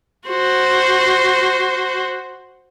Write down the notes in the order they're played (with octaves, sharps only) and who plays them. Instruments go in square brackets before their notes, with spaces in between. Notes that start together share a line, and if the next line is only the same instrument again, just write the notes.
[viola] F#4 C5